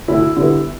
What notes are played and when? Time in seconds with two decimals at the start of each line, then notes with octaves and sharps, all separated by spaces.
0.08 D2 E4
0.36 D3 G3 B3 E4